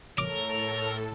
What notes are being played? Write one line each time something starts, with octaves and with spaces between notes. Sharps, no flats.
A2 A4 A#4 C#5 D6